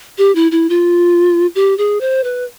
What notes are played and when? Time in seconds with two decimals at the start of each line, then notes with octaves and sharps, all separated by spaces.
0.18 G4
0.35 E4
0.52 E4
0.69 F4
1.55 G4
1.78 G#4
2.01 C5
2.24 B4